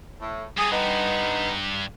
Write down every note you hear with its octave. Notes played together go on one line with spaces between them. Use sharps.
A2
G2 G#4
D3 B3 D#4